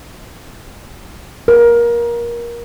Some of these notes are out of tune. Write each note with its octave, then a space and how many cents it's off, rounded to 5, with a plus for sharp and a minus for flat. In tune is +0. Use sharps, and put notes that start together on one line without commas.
A#4 +20